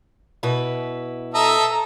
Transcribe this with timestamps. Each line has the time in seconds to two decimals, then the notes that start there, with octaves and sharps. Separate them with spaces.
0.43 B2 E4 B4
1.34 A4 D#5 E5 A5 A#5